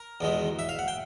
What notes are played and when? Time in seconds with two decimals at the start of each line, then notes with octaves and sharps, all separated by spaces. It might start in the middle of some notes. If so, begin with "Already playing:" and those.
Already playing: A#4
0.21 E2 B2 G#3
0.59 E5
0.69 F5
0.79 F#5
0.88 G5